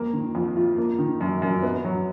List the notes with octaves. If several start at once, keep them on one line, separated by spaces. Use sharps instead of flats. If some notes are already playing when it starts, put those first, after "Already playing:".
Already playing: F2 A#3
D#3
F2
F4
A#3
D#3
F#2
F#2
B3
F#3